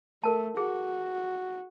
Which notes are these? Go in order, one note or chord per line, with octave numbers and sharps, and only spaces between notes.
A3 A4 A#4 A5
F#4 G#4